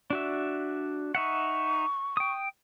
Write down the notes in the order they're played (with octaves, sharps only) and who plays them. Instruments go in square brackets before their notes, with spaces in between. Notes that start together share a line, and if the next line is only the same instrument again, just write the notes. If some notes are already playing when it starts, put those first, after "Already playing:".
[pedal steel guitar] D4 F#4 E5
[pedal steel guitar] D#4 E5 F#5 [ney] C#6
[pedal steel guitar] G5 D#6